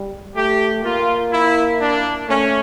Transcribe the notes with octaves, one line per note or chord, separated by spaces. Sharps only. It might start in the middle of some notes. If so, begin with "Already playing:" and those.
Already playing: G3
A3 G4
A#3 F4
E4
D4
A3 C#4